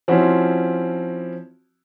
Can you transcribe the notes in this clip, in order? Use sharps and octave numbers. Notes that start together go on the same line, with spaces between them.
F3 C4 C#4 E4 F#4